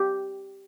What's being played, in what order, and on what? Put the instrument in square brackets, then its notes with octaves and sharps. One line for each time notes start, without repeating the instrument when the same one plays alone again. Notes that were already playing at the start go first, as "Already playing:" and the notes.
Already playing: [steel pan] G4